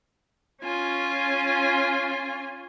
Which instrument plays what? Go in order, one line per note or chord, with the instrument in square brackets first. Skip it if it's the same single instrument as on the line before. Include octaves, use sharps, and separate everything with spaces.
[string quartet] C#4 F4 G#5